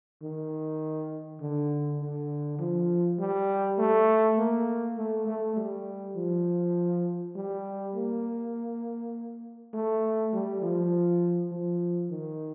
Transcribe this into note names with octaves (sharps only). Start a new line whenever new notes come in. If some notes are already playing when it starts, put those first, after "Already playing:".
D#3
D3
D3
F3
G3
A3
A#3
A3
A3
G3
F3
G3
A#3
A3
G3
F3
F3
D#3